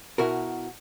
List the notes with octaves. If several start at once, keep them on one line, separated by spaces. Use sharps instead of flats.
B2 E4 F#4 A#4